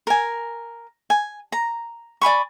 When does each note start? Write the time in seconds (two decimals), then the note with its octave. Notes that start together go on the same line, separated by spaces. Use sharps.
0.07 A#4 G#5
1.10 G#5
1.52 A#5
2.21 D5 G#5 B5 C#6